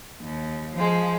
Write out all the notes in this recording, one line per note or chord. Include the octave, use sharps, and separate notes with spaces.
D#2
F3 G#3